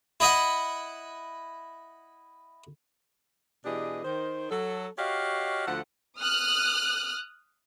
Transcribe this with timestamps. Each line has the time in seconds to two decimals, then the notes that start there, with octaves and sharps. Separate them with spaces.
0.20 E4 D#5 E5 F#5
3.65 B2 E3 D4 G4 G#4 D#5
4.04 D#3 C5
4.50 F#3 A4
4.98 F#4 G4 C#5 D#5 F5
5.67 D2 F3 A4 F#5
6.20 D#6 F6 F#6